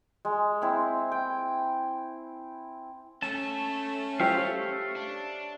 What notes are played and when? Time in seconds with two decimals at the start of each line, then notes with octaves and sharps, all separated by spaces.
0.25 G#3
0.62 C4 E4
1.12 G5
3.22 A3 C#4 A4 A5
4.20 G4 C5 C#5 E5 F5 G5
4.96 D4